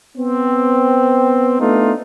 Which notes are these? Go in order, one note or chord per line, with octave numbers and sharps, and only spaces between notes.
B3 C4
A3 B3 D4 D#4 F4